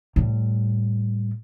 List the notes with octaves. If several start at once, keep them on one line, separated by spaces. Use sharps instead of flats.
A2 G3